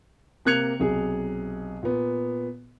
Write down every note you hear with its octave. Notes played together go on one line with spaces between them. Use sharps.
C3 A#3 F#6 G#6 C#7 F7
B1 C3 G#4
A#2 B3